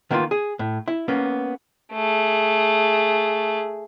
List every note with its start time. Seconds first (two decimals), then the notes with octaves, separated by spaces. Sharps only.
0.11 D#3 A#3 B3 D#4 F4
0.31 G#4
0.59 A2
0.88 E4
1.08 A#3 B3 C#4
1.93 A3 G#4